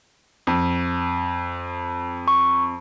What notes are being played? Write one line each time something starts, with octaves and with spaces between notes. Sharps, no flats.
F2
C#6